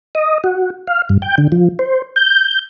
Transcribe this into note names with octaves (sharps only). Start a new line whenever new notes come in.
D#5
F#4
F5
G2
G5
D3
F3
C5
G6